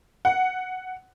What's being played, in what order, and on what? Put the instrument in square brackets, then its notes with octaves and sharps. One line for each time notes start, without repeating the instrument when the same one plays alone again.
[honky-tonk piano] F#5